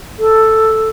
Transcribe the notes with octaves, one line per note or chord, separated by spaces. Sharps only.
A4